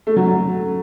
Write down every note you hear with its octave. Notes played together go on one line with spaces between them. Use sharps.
A3
F#3
F#3